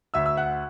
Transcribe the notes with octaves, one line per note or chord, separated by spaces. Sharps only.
D2 E5 E6
E6
F#5 F#6